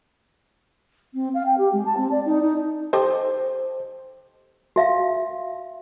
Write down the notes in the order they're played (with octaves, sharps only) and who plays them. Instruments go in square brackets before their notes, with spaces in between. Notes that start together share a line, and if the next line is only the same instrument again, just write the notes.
[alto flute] C4
F5
G5
G4
G#3
A5
C4
D5
D#4
D#4
[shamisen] G4 A4 D#5 [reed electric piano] C5
[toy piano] F#4 E5 F5